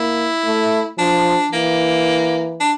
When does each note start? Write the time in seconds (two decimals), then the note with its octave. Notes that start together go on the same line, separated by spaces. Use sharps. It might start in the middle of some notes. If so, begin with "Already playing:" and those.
Already playing: A#3 E4
0.45 A3
0.98 F3 D4
1.52 E3 A#3
2.60 D4